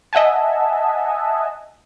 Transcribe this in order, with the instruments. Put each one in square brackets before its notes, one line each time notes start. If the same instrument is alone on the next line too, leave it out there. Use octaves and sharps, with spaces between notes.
[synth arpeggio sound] D#5 E5 F#5 G#5 A5